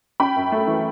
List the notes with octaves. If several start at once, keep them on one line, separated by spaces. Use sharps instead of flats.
C#4 G5 B5
F#2
A3
E3